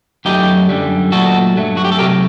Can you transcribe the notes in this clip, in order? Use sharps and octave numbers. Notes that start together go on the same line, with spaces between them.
F#2 F#3 A3 D#4 G4
F#2 D3 G3
A#2 F#3 A3 F#4 A4
G2 F#3 A3
F#4
G4
A4
C3 F#3 A3 G4 A#4